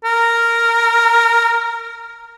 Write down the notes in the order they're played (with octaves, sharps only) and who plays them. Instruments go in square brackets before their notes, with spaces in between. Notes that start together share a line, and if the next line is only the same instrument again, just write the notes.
[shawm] A#4